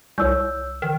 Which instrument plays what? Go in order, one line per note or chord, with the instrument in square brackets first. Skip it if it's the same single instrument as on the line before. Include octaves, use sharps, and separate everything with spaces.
[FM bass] C2 [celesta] C#5 E6 G6
[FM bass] D#3